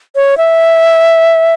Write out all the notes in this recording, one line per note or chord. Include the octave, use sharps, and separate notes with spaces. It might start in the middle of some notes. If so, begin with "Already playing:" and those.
C#5
E5